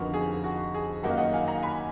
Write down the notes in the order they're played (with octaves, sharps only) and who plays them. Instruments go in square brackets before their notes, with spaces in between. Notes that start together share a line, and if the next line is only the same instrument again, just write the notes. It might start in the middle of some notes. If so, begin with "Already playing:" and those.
Already playing: [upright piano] F2 D3 F3 B3 D#4 [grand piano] F#4 A#4
[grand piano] G#4
F#4
G#4
[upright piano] F#2 D#3 A#3 D#4 F#4 [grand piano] F#5
[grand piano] F5
D#5 F#5
F5 G#5
F#5 A#5
G#5 B5